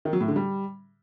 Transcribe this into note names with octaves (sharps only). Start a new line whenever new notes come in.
D#3
F#3
A2
D3
G3